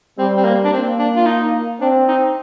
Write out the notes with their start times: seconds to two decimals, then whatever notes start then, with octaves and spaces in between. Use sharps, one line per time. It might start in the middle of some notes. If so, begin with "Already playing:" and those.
0.18 G3 C4
0.37 C4
0.45 A#3
0.64 D4
0.72 A#3 C4
0.99 D4
1.16 F4
1.26 D#4
1.80 C4 D4
2.08 D#4